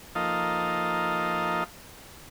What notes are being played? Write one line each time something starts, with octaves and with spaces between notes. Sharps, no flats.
F3 A#3 D#4 A4 D#5 F5